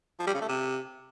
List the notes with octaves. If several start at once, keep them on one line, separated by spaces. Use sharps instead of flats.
F3
G3
C#3
A3
C3